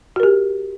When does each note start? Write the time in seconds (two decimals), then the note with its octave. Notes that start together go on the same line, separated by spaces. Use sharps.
0.16 F#4
0.20 A#4
0.23 G4